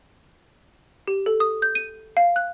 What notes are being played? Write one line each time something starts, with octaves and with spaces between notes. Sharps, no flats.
G4
A4
D#6
G6
D#7
F5
F#6